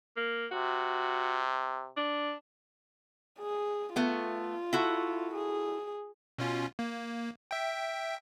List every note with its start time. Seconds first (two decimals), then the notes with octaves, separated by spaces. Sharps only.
0.17 A#3
0.51 C3 F#4
1.97 D4
3.39 G#4
3.96 A3 B3 F4
4.73 E4 F#4 A4
5.34 G#4
6.38 B2 C#4 F4
6.79 A#3
7.51 E5 G5